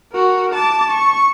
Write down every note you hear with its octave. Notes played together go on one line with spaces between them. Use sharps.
F#4 A#4
A5 D6
C#6